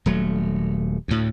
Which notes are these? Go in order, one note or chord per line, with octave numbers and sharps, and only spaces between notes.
D#1 F#3 A3
D2 A2